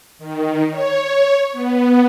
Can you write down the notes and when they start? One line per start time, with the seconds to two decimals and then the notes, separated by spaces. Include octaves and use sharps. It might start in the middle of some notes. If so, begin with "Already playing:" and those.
0.19 D#3
0.70 C#5
1.53 B3